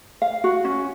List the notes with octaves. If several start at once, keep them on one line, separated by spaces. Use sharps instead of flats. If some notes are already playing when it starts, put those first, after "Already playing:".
F5
F#4
C#4